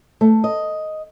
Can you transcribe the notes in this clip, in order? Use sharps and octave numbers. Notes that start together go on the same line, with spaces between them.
A3
D#5